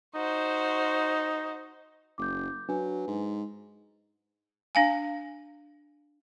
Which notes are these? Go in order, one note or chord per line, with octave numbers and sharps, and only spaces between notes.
D#4 F#4 C5
F#1 D6 G6
F#3 D4 B4 G#5
G#2
D4 F5 G#5